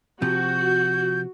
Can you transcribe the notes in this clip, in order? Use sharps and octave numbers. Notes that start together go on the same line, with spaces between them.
C3 F3 F#4 G6